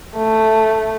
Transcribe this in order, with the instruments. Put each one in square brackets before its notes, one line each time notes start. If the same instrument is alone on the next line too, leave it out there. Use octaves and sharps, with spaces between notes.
[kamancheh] A3